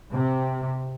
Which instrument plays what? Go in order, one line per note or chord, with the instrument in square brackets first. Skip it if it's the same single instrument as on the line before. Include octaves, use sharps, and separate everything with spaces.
[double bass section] C3